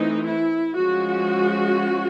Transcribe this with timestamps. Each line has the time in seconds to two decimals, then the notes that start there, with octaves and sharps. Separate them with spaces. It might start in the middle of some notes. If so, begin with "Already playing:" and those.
Already playing: E3 A3 C4 D#4
0.25 E4
0.75 F3 G#3 C#4 F#4